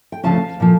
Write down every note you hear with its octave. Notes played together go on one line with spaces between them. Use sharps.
G5
D2 C#3 F3 C#4 F5 A5
A#2 F3